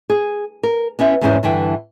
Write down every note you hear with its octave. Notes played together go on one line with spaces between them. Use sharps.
G#4
A#4
B3 C#4 E4 E5
E2 G#2 G#3 C#4 E4 C5
G2 D3 E3 E4 G5